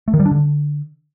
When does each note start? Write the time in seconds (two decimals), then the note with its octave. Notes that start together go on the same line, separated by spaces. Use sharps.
0.08 A3
0.14 D#3
0.20 G3
0.26 D4
0.31 D3